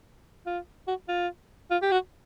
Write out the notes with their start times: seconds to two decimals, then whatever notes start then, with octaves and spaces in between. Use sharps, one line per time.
0.47 F4
0.88 F#4
1.09 F4
1.71 F4
1.83 G4
1.92 F#4